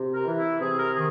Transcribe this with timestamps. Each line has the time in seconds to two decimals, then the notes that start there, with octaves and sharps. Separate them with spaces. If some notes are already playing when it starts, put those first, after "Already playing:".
Already playing: C3
0.14 A#4
0.26 E3
0.38 E4
0.60 C3 G#4
0.78 A#4
0.95 D#3 G#4